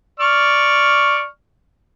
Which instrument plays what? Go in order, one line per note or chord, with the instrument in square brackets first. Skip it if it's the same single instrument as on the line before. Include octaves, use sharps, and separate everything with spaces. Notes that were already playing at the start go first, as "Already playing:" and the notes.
[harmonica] D5 C#6 F6